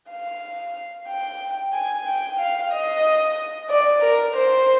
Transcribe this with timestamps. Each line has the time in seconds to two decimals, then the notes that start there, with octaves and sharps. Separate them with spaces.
0.11 F5
1.09 G5
1.74 G#5
2.07 G5
2.39 F5
2.72 D#5
3.70 D5
4.02 A#4
4.35 C5